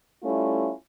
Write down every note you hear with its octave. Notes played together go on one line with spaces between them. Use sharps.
G3 A3 C#4 E4 F4